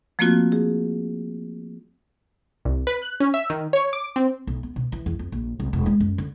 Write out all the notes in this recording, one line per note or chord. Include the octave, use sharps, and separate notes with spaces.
F3 A3 A#3 C4 F4 F#4
G#4
C2
B4
F#6
C#4
E5
D#3
C#5
D6
C4
B1
B3
B2
E3
E2
F2
A#1
C2
E1
G#3
F#2
D3